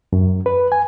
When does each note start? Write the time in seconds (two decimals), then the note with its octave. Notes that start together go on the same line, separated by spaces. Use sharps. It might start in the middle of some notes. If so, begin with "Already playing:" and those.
0.13 F#2
0.46 B4
0.72 G#5